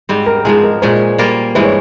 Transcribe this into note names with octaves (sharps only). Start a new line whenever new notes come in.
G#2 G3 C4
A#4
G#2 F3 G#3 G#4
A#4
A#2 G#3 C#4 C5
G3 A#3 F4 A#4
G2 E3 G#3 C5
C#5